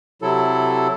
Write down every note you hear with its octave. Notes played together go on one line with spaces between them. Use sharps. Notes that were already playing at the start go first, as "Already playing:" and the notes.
C3 F#3 E4 A4